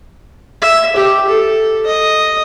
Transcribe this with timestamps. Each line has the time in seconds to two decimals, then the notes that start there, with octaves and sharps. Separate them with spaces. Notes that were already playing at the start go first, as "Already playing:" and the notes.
0.62 E5
0.96 G4
1.29 A4
1.86 D#5